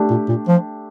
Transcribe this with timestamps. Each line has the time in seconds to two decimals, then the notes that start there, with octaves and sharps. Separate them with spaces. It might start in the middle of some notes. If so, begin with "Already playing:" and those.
Already playing: A3 D4 G4
0.10 A#2
0.29 A#2
0.48 F3